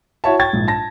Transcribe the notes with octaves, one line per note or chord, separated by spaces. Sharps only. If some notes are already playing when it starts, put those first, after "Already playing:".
E4 F#4 C#5 E5 A5
G5 C#6 G#6 A6
A#1 G#2
A5 A#6